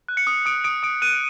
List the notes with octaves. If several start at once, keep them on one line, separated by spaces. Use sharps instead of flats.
F#6
C#7
D#6
D#6 D7
D#6 D7
D#6 D7
F#6 D#7